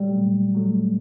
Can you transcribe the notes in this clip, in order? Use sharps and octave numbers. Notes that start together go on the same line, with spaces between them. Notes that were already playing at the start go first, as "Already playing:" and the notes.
Already playing: A#2 F#3 G3 A3
A#2
F#3 A3